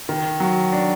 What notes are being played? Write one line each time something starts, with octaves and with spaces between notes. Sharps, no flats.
D#3
F#3
D4